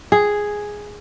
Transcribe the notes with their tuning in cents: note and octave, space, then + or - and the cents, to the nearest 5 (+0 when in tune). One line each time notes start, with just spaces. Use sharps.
G#4 +0